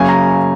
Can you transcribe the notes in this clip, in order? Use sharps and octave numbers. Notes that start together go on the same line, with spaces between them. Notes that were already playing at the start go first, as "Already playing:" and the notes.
Already playing: F#2 C#3 A#3 C#4 G#5
A#5